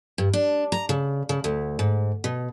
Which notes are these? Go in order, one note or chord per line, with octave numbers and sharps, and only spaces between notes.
G2
D4
A#5
C#3
C#3
D2
G#2
B2